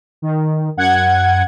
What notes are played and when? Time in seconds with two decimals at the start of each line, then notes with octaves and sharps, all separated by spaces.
0.22 D#3
0.77 F#2 F#5 G#6